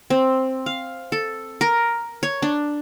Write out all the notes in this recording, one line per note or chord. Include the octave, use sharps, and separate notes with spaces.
C4
F5
A4
A#4
C#5
D4